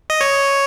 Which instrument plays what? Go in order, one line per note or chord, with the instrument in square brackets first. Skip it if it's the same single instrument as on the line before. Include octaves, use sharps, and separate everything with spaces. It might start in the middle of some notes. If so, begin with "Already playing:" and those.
[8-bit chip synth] D#5
C#5